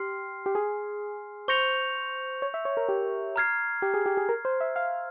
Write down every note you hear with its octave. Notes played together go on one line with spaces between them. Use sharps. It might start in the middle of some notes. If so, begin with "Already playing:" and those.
Already playing: G4 C6 F6 C7
G4
G#4
C5 C#6 G6 A#6 C#7 F7
C#5
E5
C#5
A#4
G4
A#5 F6 G#6 C7
G4
G#4
G4
G#4
A#4
C5
E5
F5